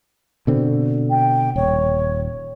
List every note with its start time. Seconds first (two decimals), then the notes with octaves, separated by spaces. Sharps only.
0.47 B2 D3 C4
1.10 G5
1.56 D#1 C#5